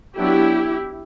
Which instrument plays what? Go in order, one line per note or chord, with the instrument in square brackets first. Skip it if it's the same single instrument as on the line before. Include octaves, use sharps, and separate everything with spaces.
[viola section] F#3 B3 D4 E4 G4